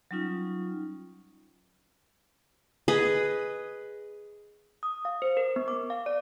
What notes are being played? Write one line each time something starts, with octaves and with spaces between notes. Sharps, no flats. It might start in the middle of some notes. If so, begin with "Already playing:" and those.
F#3 G3 C#4 D#4 F4
G#4 B4 D#5
D#6
F5
C5
A#4
B3
D6
F5
D5